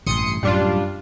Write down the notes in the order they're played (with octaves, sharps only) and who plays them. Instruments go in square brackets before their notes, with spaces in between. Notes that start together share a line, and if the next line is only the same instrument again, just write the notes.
[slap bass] A1 G2 C3 [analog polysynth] C6 D#6 C#7
[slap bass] F#2 A2 C3 [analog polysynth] G3 D4 F4